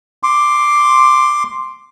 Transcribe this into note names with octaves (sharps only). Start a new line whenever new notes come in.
C6 D6